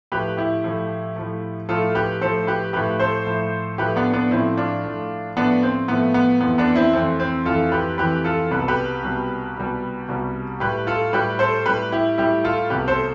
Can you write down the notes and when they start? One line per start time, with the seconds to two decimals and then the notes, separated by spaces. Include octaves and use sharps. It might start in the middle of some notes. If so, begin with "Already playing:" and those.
0.12 A2 F3 A3 G4 B4
0.37 E4 G4
0.64 A2 F3 A3
1.16 A2 F3 A3
1.69 A2 F3 A3 F4 A4
1.95 G4 B4
2.21 A2 F3 A3 A4 C5
2.47 G4 B4
2.73 A2 F3 A3 G4 B4
2.99 A4 C5
3.26 A2 F3 A3
3.78 A2 F3 A3 G4 B4
3.96 B3 D4
4.13 B3 D4
4.31 A2 F3 A3 C4 E4
4.57 D4 F4
4.84 A2 F3 A3
5.37 A2 F3 A3 B3 D4
5.63 C4
5.88 A2 F3 A3 B3
6.14 B3
6.41 F2 E3 A3 B3
6.58 B3 D4
6.76 C4 E4
6.93 F2 E3 A3 C4
7.20 C4
7.45 F2 E3 A3 F4 A4
7.72 G4 B4
7.98 F2 E3 A3 G4 B4
8.24 F4 A4
8.51 C2 B2 G3 B4
8.59 A4
8.68 G4 B4
9.03 C2 B2 G3
9.56 C2 B2 G3
10.08 C2 B2 G3
10.60 A2 G3 G4 B4
10.87 F4 A4
11.13 A2 G3 G4 B4
11.39 A4 C5
11.66 A2 G3 G4 B4
11.92 E4 G4
12.18 A2 G3 E4 G4
12.44 F4 A4
12.70 C2 B2 A3 G4 B4
12.88 A4 C5